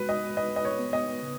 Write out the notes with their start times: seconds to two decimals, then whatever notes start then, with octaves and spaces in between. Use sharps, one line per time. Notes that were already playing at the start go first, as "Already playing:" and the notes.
Already playing: G#3 F#4 B4
0.09 D#5
0.37 B4 D#5
0.56 D#5
0.65 C#5
0.79 B3
0.93 D#5
1.22 C#3